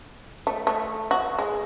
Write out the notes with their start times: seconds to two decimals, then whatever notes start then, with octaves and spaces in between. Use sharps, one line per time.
0.47 A3
0.67 A3
1.11 F#4
1.39 G#3